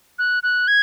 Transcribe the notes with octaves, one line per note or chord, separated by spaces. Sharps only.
F#6
F#6
G#6